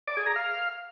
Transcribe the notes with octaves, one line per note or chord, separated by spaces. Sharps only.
D5
G#4
A#5
F5